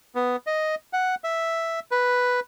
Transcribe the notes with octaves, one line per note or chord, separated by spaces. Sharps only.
B3
D#5
F#5
E5
B4